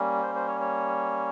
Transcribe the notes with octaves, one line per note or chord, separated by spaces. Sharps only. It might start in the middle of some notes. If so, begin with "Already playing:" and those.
Already playing: G3 A#3 C#4
C5
C5
C#5
C#5